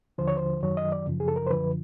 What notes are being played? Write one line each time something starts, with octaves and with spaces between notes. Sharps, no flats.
D#2 D3 F3 C5
C#5
C5
F#2 D#3 F#3 C#5
D#5
D5
F#2 C#3 F3
G#4
A4
A#4
C5
F#2 D3 F3 B4